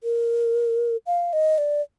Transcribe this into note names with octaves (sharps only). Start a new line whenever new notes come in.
A#4
F5
D#5
D5